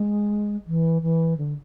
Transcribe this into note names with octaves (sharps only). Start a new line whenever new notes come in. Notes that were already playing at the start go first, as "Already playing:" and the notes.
Already playing: G#3
E3
E3
D3